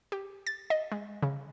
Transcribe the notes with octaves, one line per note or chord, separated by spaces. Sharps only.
G4
A6
D#5
G#3
C#3